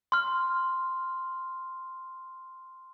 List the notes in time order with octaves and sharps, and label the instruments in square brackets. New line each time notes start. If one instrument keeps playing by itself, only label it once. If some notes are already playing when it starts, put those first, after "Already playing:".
[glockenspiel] C6 F6